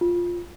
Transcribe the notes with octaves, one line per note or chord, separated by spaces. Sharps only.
F4